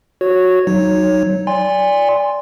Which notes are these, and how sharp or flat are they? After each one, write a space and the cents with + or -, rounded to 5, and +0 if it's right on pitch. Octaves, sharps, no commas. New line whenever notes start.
F#4 -10 C#5 +0
F#3 +15 D#4 +0 C#5 +0
D5 -15 G#5 -30 C6 +0